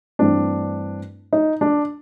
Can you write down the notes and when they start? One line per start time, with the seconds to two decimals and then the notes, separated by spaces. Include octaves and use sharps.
0.19 G2 E3 A3 C4 D4
1.33 D#4
1.61 D4